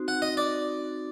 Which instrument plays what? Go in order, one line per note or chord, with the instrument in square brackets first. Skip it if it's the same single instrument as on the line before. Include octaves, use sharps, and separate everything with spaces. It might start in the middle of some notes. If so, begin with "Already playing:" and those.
Already playing: [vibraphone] C4 D#4 F#4 C5
[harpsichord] F#5
D#5
D5